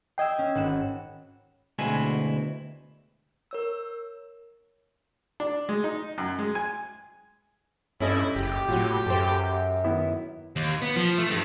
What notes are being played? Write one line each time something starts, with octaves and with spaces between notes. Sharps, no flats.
D#5 G5 E6 G#6 C7
C#4
G#1 F#5 E7
D2 B2 G#3 C4 E4 G#5
A#4 C#5 E6
D4
G#3
D#4
F#2
G#3
G#5
G2 C#4 E4 A4 D#5
F#1 G4
A2 F#3 F4
F#2 A4 C5
D#3 B3 E4
D#2
B3
F3
A3
G2